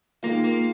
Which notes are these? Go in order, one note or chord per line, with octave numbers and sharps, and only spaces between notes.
D#3 G#3 A#3 F4
A#3